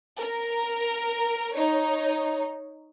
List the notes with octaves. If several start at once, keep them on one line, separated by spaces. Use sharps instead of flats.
A#4
D#4 C#5